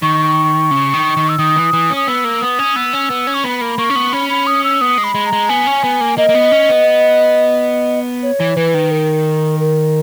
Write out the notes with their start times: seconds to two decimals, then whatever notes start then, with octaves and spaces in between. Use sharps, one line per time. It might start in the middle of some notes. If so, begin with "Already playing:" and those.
0.02 D#3 C#6
0.71 C#3
0.93 D#3
1.17 D#3
1.29 E6
1.39 D#3 D#6
1.56 E3
1.73 E3
1.90 C#4
1.96 D#6
2.07 B3 E6
2.24 A#3
2.42 B3 D#6
2.59 C#4
2.76 B3 E6
2.93 C#4
3.10 B3
3.27 C#4
3.34 C#6
3.44 B3 B5
3.61 A#3
3.78 A#3 C#6
3.90 C#4
3.96 B3
4.13 C#4 B5
4.30 B5
4.47 D#6
4.64 E6
4.81 B3 D#6
4.98 G#3
5.04 B5
5.15 G#3
5.26 A#5
5.33 G#3
5.49 B3 G#5
5.66 C#4
5.84 B3
6.01 A#3
6.18 A#3 D#5
6.29 A#3
6.35 B3
6.52 C#4
6.69 B3
8.23 C#5
8.40 E3
8.57 E3 B4
8.74 D#3
8.91 A#4
9.60 A#4